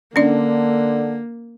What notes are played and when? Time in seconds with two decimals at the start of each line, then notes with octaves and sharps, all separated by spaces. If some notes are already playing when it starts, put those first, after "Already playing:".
0.16 D3 A#3 C#4 D4 D5